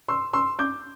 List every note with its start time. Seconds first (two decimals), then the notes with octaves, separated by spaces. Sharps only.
0.08 C6 E6
0.33 C6 E6
0.59 D6 G6